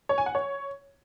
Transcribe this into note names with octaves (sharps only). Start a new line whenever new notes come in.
C#5
G#5
F#5
C#5